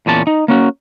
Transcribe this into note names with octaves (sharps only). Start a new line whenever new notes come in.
E2 A#2 C#4 A5
D#4
A#3 C#4 F#4